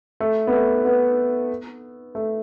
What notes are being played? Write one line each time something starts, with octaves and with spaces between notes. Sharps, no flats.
A3
B3
A3
B3
A3